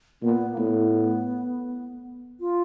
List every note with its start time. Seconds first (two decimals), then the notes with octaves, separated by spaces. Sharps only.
0.22 A#2 B3
0.52 A#3
0.58 A2 B3
2.40 F4